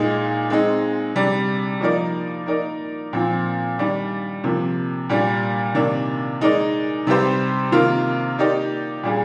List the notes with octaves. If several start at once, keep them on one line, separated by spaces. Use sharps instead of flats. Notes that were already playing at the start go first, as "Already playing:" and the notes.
Already playing: A#2 G#3 D#4
G#3 C4 D#4
C3 G3 D4
F3 A#3 D#4 A#4 D5
A#3 D#4 A#4 D5
A#2 F3 C4
D#3 G3 D4
C3 F3 A#3
A#2 G3 D4
C3 D#3 A#3 D4
G#3 D#4 A#4 D5
C3 G3 C4 G4 C5
C3 D#3 A#3 F4 A#4
A#3 D#4 G4 D5
A#2 G3 D4 G#4